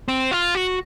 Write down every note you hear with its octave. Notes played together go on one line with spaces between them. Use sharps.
C4
F4
F#4